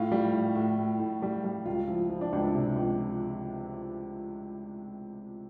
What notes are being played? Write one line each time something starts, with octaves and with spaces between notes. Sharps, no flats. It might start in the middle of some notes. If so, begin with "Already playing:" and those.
Already playing: A2 F4
G3
A2
A2
A2
A2
G3
G3
C#2 F4
F3 E4
F3
D4
C#2 D4
E4
C3
C#2